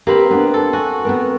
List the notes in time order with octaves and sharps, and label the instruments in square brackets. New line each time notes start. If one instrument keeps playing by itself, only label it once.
[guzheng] A#3 C4 B5 [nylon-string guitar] G4 B4
[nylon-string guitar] B3 D4
[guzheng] A4
[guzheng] F#4 [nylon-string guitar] G#5
[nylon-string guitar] B3 C4 A#4